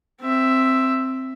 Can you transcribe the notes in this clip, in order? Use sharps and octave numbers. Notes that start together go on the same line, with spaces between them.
C4 E5